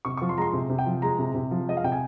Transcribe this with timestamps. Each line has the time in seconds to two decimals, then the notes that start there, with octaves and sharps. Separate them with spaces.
0.05 C3 C#6
0.17 C#6
0.22 F3
0.29 C6
0.38 G#3 A#5
0.42 C6
0.53 C3
0.69 C3
0.79 G5
0.86 F3
1.02 G#3 A#5
1.19 C3
1.34 C3
1.51 F3
1.67 G#3 D#5
1.77 F5
1.84 C3 G5
1.92 G#5